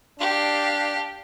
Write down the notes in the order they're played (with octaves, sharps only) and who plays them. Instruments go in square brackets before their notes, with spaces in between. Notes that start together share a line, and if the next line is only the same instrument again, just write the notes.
[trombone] D4 [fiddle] G4 F5